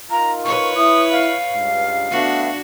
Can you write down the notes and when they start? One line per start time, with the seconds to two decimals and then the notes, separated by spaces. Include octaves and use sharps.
0.11 D#4 F4 A#4 A#5
0.45 B4 C#5 C#6
0.77 E4 D#6
1.11 F5
1.53 C#2 G2
2.11 A3 B3 D4 F#4